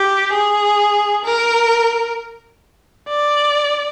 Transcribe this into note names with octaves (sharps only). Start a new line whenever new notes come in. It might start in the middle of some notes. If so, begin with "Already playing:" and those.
Already playing: G4
G#4
A#4
D5